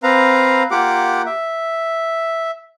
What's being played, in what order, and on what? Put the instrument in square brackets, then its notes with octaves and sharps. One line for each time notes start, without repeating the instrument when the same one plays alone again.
[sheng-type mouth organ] C4 B4 F5 A#5
A#3 F4 G4 F#5 D6
E5